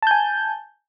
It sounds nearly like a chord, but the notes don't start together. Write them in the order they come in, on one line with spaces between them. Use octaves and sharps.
A5 G6 G#5